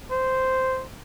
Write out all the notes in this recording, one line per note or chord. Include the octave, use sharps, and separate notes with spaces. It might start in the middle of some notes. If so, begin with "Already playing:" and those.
C5